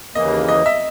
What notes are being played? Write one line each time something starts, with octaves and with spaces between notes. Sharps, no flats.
D#2 C#3 E3 A#3 D#5
D#5
E5